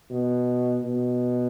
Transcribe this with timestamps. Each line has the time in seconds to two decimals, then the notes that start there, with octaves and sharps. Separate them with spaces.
0.10 B2
0.84 B2